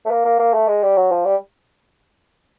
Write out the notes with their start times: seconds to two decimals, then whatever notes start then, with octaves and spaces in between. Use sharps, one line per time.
0.06 A3
0.11 A#3
0.25 A#3
0.39 A#3
0.54 A3
0.68 G#3
0.83 G3
0.97 F#3
1.11 F3
1.26 G3